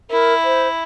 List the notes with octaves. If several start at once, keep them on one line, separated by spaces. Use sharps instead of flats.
E4 A#4
C5